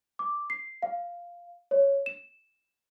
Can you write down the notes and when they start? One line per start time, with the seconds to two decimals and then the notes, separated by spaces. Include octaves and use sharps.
0.19 D6
0.50 C7
0.82 F5
1.71 C#5
2.06 E7